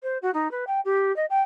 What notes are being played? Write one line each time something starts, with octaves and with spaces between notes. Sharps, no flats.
C5
F#4
D#4
B4
G5
G4
D#5
G5